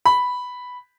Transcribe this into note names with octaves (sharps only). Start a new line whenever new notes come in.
B5